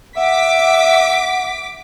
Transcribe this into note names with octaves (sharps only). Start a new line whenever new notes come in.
E5 F#5 D6 B6